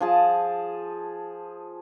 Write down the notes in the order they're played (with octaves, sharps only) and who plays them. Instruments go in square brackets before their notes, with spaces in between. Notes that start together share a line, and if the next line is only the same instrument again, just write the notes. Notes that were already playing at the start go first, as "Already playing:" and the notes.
[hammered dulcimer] F3 G#4 A5